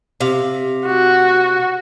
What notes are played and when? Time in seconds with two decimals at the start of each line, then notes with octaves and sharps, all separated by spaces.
0.21 C3 F5
0.86 F#4